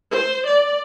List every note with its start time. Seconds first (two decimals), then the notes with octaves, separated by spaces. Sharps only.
0.11 C5
0.47 D5